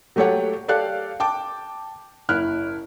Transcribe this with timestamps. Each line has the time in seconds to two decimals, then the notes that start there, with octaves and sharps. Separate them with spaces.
0.16 F#3 A3 G4 A4 C#5 F#5
0.68 G4 A4 D5 F5 F#6
1.20 G5 A5 D6
2.29 F#1 E4 F6 F#6